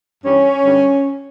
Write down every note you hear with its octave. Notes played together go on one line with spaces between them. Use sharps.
G2 E3 G3 C#4
G2 D3 G3